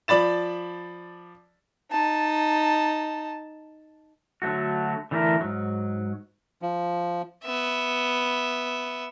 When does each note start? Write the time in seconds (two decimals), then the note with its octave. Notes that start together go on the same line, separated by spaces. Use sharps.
0.08 F3 D5 B5 A6 E7
1.91 D#4 A5
4.42 D3 F#3 A3 F#4
5.11 D3 E3 A3 F4 A#4 E5
5.41 G#2 F#3
6.62 F3
7.44 B3 E5